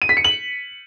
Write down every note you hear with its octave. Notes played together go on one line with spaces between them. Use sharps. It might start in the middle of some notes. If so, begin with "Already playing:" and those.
D#7
B6
C#7
F#7